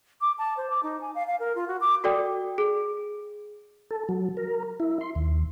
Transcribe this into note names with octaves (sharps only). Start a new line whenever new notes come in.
D6
A5
C5
D6
D#4
G#5
F5
F5
A#4
F4
F#4
D6
F#4 A4 D5 G5
G#4
A4
F#3
A#4
E4
C6
D#2